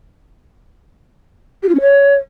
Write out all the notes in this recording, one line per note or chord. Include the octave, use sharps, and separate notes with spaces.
G4
F4
C#4
C#5